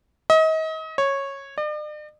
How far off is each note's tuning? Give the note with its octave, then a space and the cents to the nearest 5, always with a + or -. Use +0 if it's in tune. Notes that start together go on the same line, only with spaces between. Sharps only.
D#5 +35
C#5 -10
D5 +45